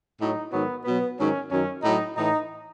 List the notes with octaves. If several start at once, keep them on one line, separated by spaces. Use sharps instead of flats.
A2 F#3 D#4
G#2 D#3 F#3 B3
B2 F#3 B3
G#2 D#3 F#3 C#4
F#2 D#3 F#3 C#4
A2 F#3 D#4
A2 E3 D#4